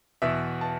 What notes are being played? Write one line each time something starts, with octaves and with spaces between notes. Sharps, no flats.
E2 B2 E5
A5